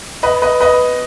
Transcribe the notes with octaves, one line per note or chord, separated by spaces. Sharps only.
B4 D#5
B4 D#5
B4 D#5